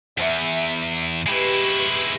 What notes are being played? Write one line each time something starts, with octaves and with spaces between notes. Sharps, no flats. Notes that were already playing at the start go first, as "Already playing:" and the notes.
E2 E5
G#3 E4 G4 B4 C#6